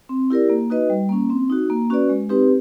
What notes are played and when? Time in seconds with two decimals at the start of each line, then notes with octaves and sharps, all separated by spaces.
0.09 C4
0.30 E4 G4 A#4 D5
0.50 A#3
0.70 D#4 F#4 B4 D#5
0.90 G3
1.09 A#3 C#4
1.30 C4
1.50 D#4 F#4
1.70 A#3
1.90 C#4 F#4 B4 D5
2.09 G#3
2.29 C4 D#4 G4 B4